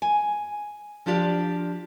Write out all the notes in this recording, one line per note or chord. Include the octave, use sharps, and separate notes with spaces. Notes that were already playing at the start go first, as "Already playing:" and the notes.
G#5
F3 D4 F4 G4 D5